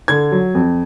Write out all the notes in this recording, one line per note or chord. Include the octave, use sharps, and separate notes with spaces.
D3 G#6
F#3
F2